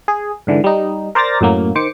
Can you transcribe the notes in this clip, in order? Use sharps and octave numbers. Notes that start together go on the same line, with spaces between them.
G#4
G#2 D3 E3
G3 D#4
A#4 C5 D5 A#5 A6 A#6
F#2 A2 F#3 A#3
D#3 C5 D6 C#7